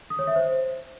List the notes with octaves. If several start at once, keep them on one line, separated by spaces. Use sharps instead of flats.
D#6
C#5
E5
C5